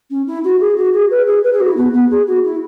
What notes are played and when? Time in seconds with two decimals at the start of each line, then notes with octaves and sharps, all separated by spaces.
0.10 C#4
0.27 E4
0.44 F#4
0.60 G#4
0.77 F#4
0.93 G#4
1.10 B4
1.27 G#4
1.44 B4
1.52 G#4
1.60 F#4
1.68 E4
1.76 B3
1.93 B3
2.11 G#4
2.27 F#4
2.44 E4